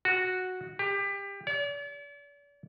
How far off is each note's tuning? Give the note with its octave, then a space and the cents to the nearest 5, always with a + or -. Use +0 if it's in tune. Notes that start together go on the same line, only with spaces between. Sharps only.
F#4 -5
G4 +25
D5 -45